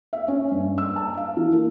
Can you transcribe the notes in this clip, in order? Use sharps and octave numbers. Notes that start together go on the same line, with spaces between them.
E5
C#4
G2
E6
A5
F5
E3
A#3